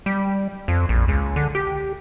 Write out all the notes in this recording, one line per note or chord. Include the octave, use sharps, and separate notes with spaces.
G3
F2
A#1
C#2
D3
G4